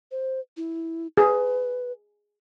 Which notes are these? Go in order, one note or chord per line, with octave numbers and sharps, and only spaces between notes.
C5
E4
G#4 B4